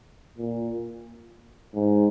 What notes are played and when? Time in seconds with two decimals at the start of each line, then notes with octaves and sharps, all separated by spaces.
0.38 A#2
1.74 G#2